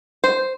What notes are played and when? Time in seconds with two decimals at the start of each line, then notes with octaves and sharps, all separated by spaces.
0.24 C5